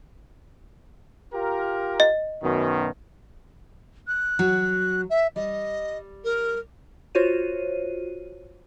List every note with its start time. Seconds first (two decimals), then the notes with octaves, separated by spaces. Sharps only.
1.33 F4 G4 A#4
2.00 D#5
2.43 F#2 B2 D#3
4.07 F#6
4.39 F#3 F#4
5.10 E5
5.36 G3 D#5
6.24 A#4
7.15 F4 F#4 C5 C#5 D#7